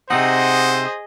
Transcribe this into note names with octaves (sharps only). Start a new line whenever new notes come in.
C3 C4 D#4 G#4 C5 D#5 F#5